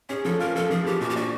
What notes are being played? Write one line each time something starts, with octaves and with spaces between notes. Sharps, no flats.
C#4 G#4
F3 A4
F4 A#4
F3 A4
F3 G#4
F3 G4
A#2 F#4
G4
D4 F#4